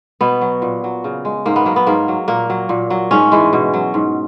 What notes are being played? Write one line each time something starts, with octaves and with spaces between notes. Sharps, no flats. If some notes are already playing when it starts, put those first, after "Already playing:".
B2 B3
F#3
A#2
F#3
C#3
G#3
G#2 A#3
B3
F#3 A#3
B3
G#2 A#3
F#3
A#2 A#3
F#3
A#2
F#3
G#2 C#4
E3 G#3
B2
F#3
G#2